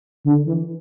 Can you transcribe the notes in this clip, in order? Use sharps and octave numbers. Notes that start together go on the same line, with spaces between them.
D3
E3